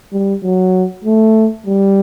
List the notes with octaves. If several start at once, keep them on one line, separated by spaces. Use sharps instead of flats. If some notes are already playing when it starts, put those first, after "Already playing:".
G3
F#3
A3
G3